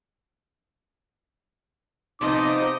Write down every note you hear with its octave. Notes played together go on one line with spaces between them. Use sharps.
C3 F3 B3 D#4 D#5 D6